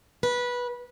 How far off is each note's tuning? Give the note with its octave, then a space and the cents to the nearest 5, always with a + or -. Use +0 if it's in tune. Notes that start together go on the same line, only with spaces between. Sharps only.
B4 -15